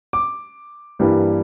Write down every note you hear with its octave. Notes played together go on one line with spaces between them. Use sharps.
D6
G2 E3 G3 A#3